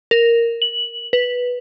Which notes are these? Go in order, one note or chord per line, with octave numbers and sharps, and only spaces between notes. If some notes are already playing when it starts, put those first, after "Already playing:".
A#4
F#7
B4